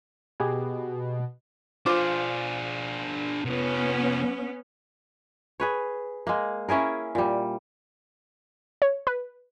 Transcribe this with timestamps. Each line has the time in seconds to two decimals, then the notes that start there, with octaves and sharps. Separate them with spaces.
0.40 B2 G4 G#4 G#5
1.86 D4 F4 G#4 C5 D6
3.45 C3 F3 B3 C#4
5.60 G#4 B4 C#5
6.27 G#3 A#3
6.69 C#4 E4 G#4 A#4
7.15 A#2 G3
8.82 C#5
9.07 B4